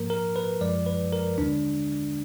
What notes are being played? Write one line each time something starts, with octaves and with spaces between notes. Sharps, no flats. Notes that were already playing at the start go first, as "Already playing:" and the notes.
Already playing: G#2 F3 A#3 A#4
A#4
B4
F#2 F3 G#3 D5
B4
A#4
D#2 D3 G#3 D4